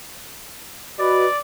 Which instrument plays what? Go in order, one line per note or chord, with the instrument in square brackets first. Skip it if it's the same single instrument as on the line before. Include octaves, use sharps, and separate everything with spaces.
[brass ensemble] F#4 B4 D#5 [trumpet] D5